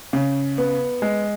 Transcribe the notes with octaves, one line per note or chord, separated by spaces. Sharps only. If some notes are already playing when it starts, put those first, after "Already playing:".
C#3
B3
G#3